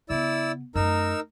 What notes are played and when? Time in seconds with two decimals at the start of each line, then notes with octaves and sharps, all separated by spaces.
0.09 C#3 B3 E4 D5 E6
0.75 F#2 A3 D#4 A#4 E6